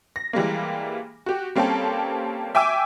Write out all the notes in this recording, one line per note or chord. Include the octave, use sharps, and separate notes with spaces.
A#6
E3 G3 G#3 A#3
F#4 G4
G3 A#3 C4 C#4 G4 A4
E5 G5 G#5 D6 E6